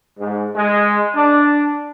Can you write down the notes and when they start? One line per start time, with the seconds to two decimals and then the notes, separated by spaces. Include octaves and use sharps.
0.18 G#2
0.55 G#3
1.15 D4